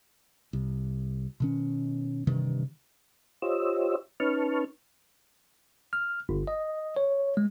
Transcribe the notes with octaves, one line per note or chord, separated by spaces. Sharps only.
C2
B2 D#3 C#4
G2 C3 D#3 E3
F4 G4 C5 C#5 D#5 E6
C#4 D#4 B4 A5 C#6 F6
F6
G1
D#5
C#5
G#3